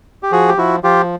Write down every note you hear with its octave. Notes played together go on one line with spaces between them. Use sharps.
G4
F3 F#4 G#4
G4
F3 E4 F#4
F3 F4 G4